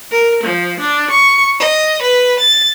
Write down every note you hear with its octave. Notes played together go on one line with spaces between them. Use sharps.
A#4
F3
D4
C#6
D#5
B4
A6